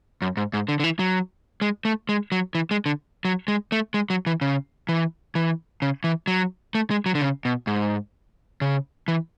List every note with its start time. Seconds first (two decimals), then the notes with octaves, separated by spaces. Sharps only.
0.22 F#2
0.37 G#2
0.53 G#2
0.68 D3
0.80 D3
0.84 E3
0.99 F#3
1.61 G#3
1.85 A3
2.09 G#3
2.32 F#3
2.55 E3
2.71 G#3
2.86 D3
3.25 F#3
3.48 G#3
3.72 A3
3.94 G#3
4.10 F#3
4.26 E3
4.41 C#3
4.89 E3
5.35 E3
5.82 C#3
6.04 E3
6.27 F#3
6.75 A3
6.90 G#3
7.06 F#3
7.15 D3
7.21 C#3
7.45 B2
7.67 G#2
8.61 C#3
9.08 E3